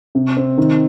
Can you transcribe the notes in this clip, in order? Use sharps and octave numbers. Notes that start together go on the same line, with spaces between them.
C3
C4
D#3